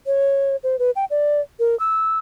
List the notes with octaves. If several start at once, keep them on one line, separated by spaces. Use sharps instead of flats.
C#5
C5
B4
G5
D5
A#4
E6